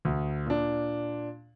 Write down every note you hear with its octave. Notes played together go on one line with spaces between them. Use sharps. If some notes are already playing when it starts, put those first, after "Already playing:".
D2
A#2 D4